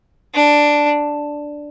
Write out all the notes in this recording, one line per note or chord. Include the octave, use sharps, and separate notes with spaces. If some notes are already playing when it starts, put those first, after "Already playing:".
D4